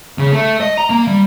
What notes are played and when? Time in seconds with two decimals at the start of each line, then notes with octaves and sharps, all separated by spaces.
0.18 C#3
0.33 A3
0.61 D#5
0.77 A#5
0.90 A#3
1.08 G3